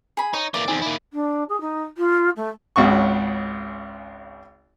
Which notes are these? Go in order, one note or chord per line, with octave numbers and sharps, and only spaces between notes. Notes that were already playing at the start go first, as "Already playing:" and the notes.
G#4 B5
D#4 C#5
E3 A#3 D5 D6
E2 C4 D#4 G#5
A#3 E4
D4
G#4
D#4
F4
A3
G#1 C#2 C#3 F#4 C#6